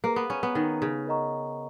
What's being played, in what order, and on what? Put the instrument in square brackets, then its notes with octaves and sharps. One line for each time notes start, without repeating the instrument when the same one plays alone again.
[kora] A#3 [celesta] G#4 B4 F5 A#5
[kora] B3
C#4
B3
D#3
C#3
[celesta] A#4 D#5 F#5 A#5 C#6